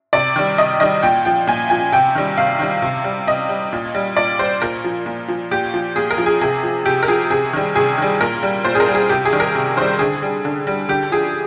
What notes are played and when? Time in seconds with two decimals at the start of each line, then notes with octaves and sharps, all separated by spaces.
0.13 C3 D5
0.36 D#3 G3
0.58 C3 D#5
0.80 D#3 G3 D#5
1.03 A#2 G5
1.25 F3 G5
1.47 A#2 G#5
1.70 F3 G#5
1.92 C3 G5
2.15 D#3 G3
2.37 C3 F5
2.59 D#3 G3
2.82 C3
3.04 G3
3.27 C3 D#5
3.49 G3
3.73 A#2
3.95 G3
4.17 A#2 D5
4.39 G3 C5
4.62 A#2 A#4
4.84 F3
5.06 A#2
5.28 F3
5.51 A#2 G4
5.74 F3
5.96 A#2 G#4
6.11 A#4
6.18 F3
6.26 G#4
6.41 C3 G#4
6.63 F3
6.86 C3 G4
7.03 A#4
7.08 F3 G#4
7.30 C3 G#4
7.53 D#3 G3
7.76 C3 G#4
7.98 D#3 G3
8.21 A#2 A#4
8.43 G3
8.65 A#2 C5
8.75 G#4
8.80 A#4
8.88 G3
8.95 G#4
9.09 C3 G4
9.25 G#4
9.32 D#3 G3
9.40 A#4
9.55 C3
9.77 D#3 G3 C5
9.99 D3 G#4
10.22 G3
10.45 D3
10.67 G3
10.89 D3 G4
11.12 F3 G#4